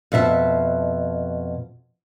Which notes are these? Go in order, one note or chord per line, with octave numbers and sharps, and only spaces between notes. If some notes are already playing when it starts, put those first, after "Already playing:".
F2 B2 E5 A5